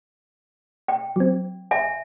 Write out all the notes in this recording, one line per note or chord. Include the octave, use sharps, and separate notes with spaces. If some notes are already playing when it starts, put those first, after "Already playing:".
G5
F#3 C4
E5 G#5